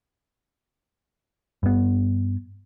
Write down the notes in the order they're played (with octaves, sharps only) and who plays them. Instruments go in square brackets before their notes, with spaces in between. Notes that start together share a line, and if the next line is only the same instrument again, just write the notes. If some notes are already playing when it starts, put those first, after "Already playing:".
[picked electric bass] G2 B3